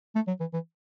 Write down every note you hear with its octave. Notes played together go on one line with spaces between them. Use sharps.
A3
F#3
E3
E3